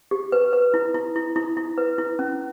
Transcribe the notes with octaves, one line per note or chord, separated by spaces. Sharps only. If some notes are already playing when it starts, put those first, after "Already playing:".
G4
B4
B4
E4
E4
E4
E4
E4
B4
E4
C#4